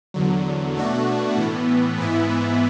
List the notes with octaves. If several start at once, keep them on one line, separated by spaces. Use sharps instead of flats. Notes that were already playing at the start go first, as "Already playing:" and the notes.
E2 D3 F#3
B2 A3 D4 F#4
A2 E3 B3
G#2 E3 B3 E4